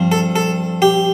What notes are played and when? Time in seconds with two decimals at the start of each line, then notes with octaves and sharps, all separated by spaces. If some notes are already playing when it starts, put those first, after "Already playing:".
Already playing: G2 F3 C4
0.12 A4
0.36 A4
0.82 G4